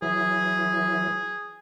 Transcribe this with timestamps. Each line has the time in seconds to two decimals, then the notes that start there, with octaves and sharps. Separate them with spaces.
0.02 E3 F#3 E4 G#4